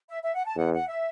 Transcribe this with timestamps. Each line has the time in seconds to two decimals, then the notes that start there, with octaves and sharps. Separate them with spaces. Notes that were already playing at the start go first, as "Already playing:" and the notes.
0.08 E5
0.23 E5
0.35 F#5
0.46 A5
0.56 E2 F#5
0.73 F#5
0.88 E5